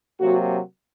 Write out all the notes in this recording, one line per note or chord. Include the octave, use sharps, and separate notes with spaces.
C3 F#3 A#3 F#4